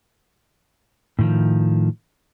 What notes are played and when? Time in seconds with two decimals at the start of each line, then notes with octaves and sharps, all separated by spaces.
1.19 A2 D#3 F3